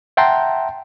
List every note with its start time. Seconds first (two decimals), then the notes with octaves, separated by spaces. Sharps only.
0.17 E5 F#5 G5 A5 A#5 C6